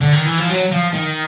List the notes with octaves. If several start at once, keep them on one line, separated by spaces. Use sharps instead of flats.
D3
D#3
E3
F3
F#3
F3
D#3